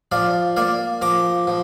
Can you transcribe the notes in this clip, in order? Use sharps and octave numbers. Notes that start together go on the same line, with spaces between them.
F3 D5 F5
A#3 D5 F5
F3 A#5 D6
F3